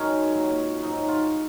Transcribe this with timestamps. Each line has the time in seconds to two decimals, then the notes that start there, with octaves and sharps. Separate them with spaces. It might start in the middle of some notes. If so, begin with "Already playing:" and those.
Already playing: F#2 D#3 G#3 C#4
0.32 A#2 F#3
0.83 G#2 F#3 D#4
1.08 F4